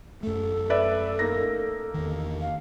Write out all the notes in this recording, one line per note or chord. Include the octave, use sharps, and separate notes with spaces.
F#2 A3 A4
B4 D5 E5
A#3 D#4 A#6
E2 D#3
F5